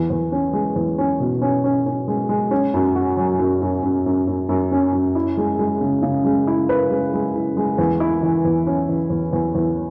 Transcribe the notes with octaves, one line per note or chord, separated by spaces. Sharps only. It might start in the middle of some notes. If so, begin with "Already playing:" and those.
Already playing: E2
E2
C#4
G#3
E2
C#4
B2
C#4
C#4
C#4
G#3
G#3
C#4
F#2
F#4
F#3
F#2
F#2
F#2
F#2
F#2
F#2
C#4
F#2
E4
G#3
G#3
C#3
C#3
G#3
E4
B4
G#3
G#3
E4
G#3
E2
E4
E3
E2
C#4
E3
E2
E2
E2